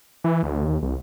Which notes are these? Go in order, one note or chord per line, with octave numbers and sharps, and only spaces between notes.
E3
D2
D#2
C2